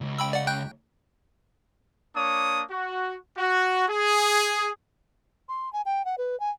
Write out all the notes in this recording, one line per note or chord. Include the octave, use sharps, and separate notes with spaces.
C#2
G5 B5 E6
D5 F#5
G5 F#6 G6
A#3 D4 C#5 D#6
F#4
F#4
G#4
C6
G#5
G5
F#5
B4
G#5